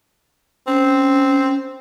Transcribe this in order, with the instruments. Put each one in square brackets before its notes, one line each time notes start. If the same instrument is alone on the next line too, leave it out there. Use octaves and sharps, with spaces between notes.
[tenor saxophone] C4 [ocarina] C#4